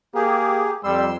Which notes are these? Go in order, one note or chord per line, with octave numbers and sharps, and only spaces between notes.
A#3 G4 G#4
F2 G3 C6 E6